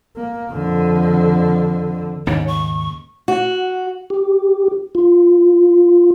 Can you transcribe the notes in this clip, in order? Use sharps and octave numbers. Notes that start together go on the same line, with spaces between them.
A#3
F2 D3
D#2 G#2 C#3 C#5
C#6
F#4
G4
F4